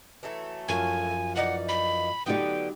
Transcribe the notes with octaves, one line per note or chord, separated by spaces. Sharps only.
E3 F#3 A3
F#2 F3 G#5
E3 D#4 D5 F#5
B5
D3 F#3 B3 D#4 G4 G5